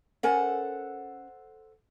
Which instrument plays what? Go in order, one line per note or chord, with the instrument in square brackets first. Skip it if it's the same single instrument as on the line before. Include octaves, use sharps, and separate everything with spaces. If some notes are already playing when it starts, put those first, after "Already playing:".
[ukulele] C#4 A#4 G#5 [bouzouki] A4 C5 F#5